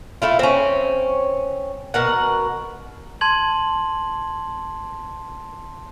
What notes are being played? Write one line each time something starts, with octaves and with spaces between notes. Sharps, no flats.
A3 E4 F4
C4 C#4
B2 A#4 F#5
A5 C6 G#6 F#7